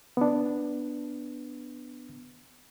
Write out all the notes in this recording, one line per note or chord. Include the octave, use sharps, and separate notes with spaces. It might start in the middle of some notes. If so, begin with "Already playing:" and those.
B3 D4